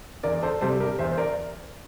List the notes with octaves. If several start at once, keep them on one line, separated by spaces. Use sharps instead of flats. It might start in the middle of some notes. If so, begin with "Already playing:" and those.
E2 A#4 D5
D5
A4 C5
C3 G3 A4 C5
G4 A#4
E2 C5 E5
C5
A#4 D5